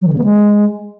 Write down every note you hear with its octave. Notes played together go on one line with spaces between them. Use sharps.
F#3
D#3
C#3
B3
G#3